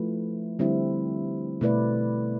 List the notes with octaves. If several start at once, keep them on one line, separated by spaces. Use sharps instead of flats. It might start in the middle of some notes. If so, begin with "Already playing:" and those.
Already playing: F3 A3 E4 B4
D3 G3 C4 E4
B2 A3 E4 B4 D5